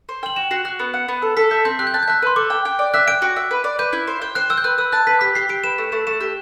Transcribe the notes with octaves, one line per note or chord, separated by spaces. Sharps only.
C5
G5 F#7
F#4 E7
F#4 C7
F#4 F#6
B3
F#5
B3
A4 E6
A4 B6
E5 G6
C4 G6
G4 F#6
G6
A5 F#6
G6
E5 F#6
B4 C6
A4 D6
G5
G5
D5
E5 F#6
G5 D7
F#4
E5
B4
D5
B4 G6
E4
C5
G5
C5 F#6
G5 E6
G6
B4 F#6
B4 E6
A5 F#6
B4 B6
G4 B6
G4 C7
G4 D7
B4 E7
A3
A3 E7
A3 E7
G4